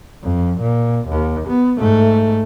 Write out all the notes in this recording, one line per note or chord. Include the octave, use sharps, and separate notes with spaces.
F2
A#2
D#2
B3
G#2 A3